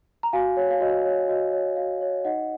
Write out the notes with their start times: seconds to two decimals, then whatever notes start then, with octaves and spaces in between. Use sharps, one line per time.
0.23 A#5
0.33 F#4 F5 G#5
0.57 C#5
0.71 F5
0.81 F#4 D#5
1.05 C#5
1.28 F#4 D#5
1.52 C#5
1.76 F#4 F5
2.01 C#5
2.25 D#4 D#5 F#5